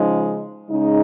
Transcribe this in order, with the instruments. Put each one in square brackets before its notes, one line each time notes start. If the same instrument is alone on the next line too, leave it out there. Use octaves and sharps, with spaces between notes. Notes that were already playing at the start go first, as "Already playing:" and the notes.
Already playing: [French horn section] C#3 F3 G#3 D#4
C#3 G#3 D#4